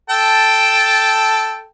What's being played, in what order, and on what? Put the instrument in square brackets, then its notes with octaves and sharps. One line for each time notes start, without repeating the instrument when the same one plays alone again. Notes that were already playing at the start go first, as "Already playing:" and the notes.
[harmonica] A4 G5 A5